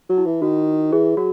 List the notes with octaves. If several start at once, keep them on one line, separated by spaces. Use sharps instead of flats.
F#3
E4
E3
D#3 F#4
E3 G#4
F#3 F#4